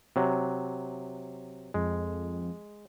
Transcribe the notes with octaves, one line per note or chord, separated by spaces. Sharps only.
C3 F#3
F2 G#3